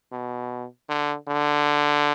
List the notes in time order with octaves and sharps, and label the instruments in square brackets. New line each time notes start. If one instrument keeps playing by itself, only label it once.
[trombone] B2
D3
D3